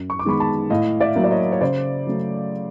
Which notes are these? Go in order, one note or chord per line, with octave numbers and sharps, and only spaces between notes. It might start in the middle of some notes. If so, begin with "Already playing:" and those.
Already playing: F#2
C#6
D6
D#3 G#3 B3 B5 C#6
A5 B5
A2 D#5 F5
D5 E5
F#3 A#3
D5
C#5 D#5
C#5
C#3 C5 D5
F#3 A3